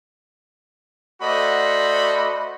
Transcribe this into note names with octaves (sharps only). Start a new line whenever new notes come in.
A3 F#4 C5 D5 D#5 B5